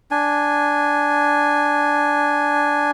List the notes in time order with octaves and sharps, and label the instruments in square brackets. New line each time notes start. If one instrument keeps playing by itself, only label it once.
[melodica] D4 G#5